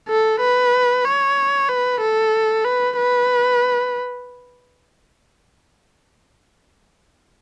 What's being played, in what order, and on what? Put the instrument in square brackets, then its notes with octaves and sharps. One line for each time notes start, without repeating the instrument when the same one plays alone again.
[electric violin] A4
B4
C#5
B4
A4
B4
B4